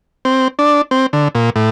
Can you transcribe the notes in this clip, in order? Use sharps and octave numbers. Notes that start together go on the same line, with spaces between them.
C4
D4
C4
D3
A#2
A2